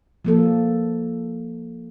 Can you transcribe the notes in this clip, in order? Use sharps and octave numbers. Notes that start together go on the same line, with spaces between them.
F3 A#3 A4